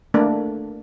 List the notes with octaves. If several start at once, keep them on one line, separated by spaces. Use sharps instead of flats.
A3 A#3 D4